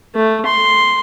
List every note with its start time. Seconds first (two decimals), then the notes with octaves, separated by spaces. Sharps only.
0.15 A3
0.46 C6